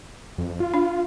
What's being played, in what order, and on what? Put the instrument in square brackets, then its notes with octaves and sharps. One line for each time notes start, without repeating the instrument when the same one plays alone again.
[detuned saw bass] F2
F4
[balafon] D4